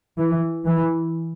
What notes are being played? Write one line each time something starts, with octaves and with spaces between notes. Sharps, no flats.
E3
E3